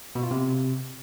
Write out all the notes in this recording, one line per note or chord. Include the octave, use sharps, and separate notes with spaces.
B2
F4
C3